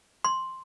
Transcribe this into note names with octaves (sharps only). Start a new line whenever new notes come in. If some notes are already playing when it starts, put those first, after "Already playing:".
C6